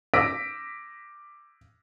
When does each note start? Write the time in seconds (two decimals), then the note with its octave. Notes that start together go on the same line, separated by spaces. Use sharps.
0.14 D6 E6 A#6 B6 D7